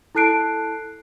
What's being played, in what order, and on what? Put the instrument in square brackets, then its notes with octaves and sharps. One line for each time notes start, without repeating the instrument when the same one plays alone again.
[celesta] E4 A4 A5 F#6 C7 D7